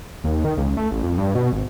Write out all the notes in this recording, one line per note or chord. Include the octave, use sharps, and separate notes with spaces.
D#2
D#3
C#2
A3
A1
F2
G2
B2
G#1